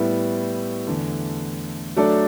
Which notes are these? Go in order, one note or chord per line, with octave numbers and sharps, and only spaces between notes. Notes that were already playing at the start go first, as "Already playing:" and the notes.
Already playing: A2 G3 B3 E4
E2 D3 A3
F#3 A3 D4 A4 D5